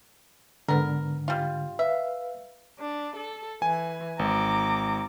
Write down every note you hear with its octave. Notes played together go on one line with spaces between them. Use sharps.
G#2 D3 B3 A#4
G3 F4
B4 E5 F5
D4
A4
E3 G#5
G#1 A#5 D6